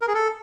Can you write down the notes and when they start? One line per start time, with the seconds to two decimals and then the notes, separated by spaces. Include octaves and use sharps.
0.01 A#4
0.08 G#4
0.14 A4